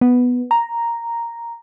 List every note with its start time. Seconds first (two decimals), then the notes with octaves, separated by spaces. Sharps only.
0.01 B3
0.51 A#5